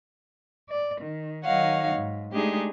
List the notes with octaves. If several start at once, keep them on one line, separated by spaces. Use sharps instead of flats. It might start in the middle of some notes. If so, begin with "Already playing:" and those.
D5
D#3
D#3 F#3 D#4 C#5 F5 F#5
G#2
G#3 A3 D4 D#4 G4 G#4